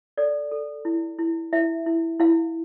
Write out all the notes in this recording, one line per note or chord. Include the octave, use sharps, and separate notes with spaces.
A4 D5
A4
E4
E4
E4 E5
E4
E4 F5